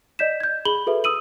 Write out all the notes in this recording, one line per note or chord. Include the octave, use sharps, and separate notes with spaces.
D5 D#5 G6 B6 E7
G6 G#6
G#4 B5 F#7 G7
F#4 G#4 A4 B4 E5
D#6 E6 D#7 F#7